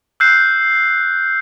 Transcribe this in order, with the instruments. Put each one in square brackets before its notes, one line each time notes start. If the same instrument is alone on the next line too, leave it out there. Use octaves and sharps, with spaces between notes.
[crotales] E6 F#6 G6 C7